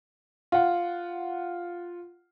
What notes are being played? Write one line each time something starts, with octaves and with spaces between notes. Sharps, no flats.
F4 F#5